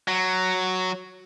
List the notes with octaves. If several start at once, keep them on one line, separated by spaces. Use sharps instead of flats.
F#3